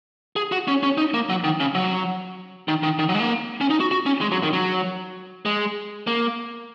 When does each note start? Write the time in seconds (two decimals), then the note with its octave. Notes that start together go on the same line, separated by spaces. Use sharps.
0.36 G#4
0.52 F#4
0.68 C#4
0.83 C#4
0.98 D#4
1.14 A#3
1.29 F#3
1.44 D#3
1.60 C#3
1.75 F#3
2.68 D#3
2.83 D#3
2.99 D#3
3.09 F#3
3.15 G#3
3.20 A#3
3.61 C#4
3.70 D#4
3.80 F#4
3.91 F#4
4.06 C#4
4.21 G#3
4.32 F#3
4.43 D#3
4.53 F#3
5.45 G#3
6.07 A#3